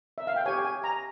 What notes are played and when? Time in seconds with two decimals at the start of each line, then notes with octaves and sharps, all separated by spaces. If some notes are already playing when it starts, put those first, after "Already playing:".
0.18 E5
0.27 F5
0.36 G5
0.46 G4 C#5 G#5
0.65 G#5
0.84 A#5